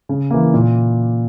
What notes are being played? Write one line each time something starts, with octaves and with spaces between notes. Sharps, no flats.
C#3
E3 A#3
A#2